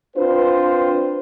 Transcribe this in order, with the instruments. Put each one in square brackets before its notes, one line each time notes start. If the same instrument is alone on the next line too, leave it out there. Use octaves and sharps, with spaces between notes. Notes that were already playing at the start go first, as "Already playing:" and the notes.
[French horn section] C4 D4 F4 B4 C5